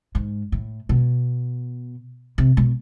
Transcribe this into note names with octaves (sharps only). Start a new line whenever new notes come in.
G#2
A2
B2
C3
B2